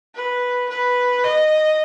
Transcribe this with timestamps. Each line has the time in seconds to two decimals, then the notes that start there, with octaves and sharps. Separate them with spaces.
0.15 B4
0.69 B4
1.24 D#5